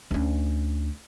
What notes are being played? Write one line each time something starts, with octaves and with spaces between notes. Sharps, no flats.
D2 C#4